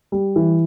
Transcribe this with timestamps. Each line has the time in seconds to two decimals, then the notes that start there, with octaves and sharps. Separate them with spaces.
0.12 G3
0.36 E3